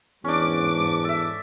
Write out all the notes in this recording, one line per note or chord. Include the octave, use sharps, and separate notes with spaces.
E2 G#2 C#4 D4 D6
A4 E5